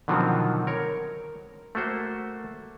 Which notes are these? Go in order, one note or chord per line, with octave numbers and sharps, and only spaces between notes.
B2 D3 D#3 F3 F#3 C4
A#4 C#5
A3 A#3 F#4 C5